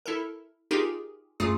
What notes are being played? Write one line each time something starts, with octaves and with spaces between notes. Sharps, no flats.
E4 A4 A#4
D#4 F4 G4 G#4 A#4
F#2 A3 F4 G#4 D#6